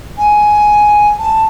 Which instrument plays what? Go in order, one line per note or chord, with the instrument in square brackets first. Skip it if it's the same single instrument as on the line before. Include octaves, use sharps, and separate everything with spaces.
[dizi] G#5
A5